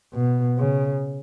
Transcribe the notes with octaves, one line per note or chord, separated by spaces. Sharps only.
B2
C#3